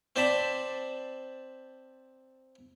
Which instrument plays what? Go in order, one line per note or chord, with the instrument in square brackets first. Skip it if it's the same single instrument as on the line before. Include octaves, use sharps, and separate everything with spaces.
[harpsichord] C4 C5 D5 A5 B5